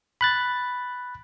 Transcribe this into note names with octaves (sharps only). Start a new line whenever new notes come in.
B5 F#6 A6